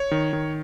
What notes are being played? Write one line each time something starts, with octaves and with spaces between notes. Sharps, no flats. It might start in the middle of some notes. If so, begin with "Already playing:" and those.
Already playing: C#5
D#3
D#3